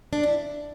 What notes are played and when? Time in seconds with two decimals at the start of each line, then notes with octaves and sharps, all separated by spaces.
0.13 D4
0.23 E4